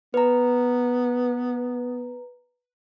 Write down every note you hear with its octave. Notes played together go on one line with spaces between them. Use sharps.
B3 B4 A#5